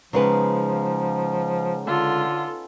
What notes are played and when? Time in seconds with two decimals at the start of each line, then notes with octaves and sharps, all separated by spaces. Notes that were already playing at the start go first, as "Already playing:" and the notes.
0.13 C#3 F3 G#3 B3 C#4 D#4 B4
1.87 D3 F4 A4